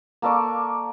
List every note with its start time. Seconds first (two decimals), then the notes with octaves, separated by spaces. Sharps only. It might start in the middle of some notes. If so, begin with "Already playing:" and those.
0.22 A#3 A4 D5 C#6